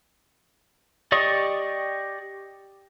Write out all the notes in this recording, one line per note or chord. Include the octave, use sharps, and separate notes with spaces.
G4 D5 D#5 C#6 D#6